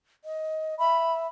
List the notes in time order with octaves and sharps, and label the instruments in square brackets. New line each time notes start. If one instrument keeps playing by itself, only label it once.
[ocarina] D#5
[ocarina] E5 [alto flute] B5